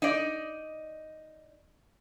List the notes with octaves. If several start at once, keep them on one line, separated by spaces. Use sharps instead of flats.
D#4 D5